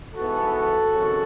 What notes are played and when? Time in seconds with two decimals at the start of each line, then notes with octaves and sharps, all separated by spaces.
0.15 G#2 E3 B3 F#4 A4
0.91 G#1 F#2 C#3